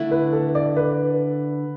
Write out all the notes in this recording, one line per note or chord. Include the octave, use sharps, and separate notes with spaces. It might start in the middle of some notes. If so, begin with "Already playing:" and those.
Already playing: D3 A3 E4
B4
A4
D5
B4